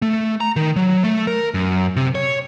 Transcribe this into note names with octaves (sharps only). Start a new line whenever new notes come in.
A3
A#5
D#3
F#3
A3
A#4
F#2
C3
C#5